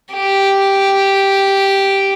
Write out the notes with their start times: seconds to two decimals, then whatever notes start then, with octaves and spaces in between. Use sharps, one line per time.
0.13 G4